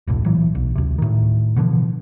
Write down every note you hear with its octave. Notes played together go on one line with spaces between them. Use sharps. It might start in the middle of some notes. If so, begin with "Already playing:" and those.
E1 C2 A2
C#2 A#2 E3 F#3
B1
D2 C3
A2 D#3
B2 D3 E3 F3